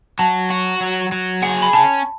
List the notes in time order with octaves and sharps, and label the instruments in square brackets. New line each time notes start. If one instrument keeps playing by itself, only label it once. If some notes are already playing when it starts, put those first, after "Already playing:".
[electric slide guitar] F#3 [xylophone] A5
[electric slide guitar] F#4
F#3
F#3
[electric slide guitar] G#4 [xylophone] F#5
[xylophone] B5
[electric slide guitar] C#4 [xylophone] A5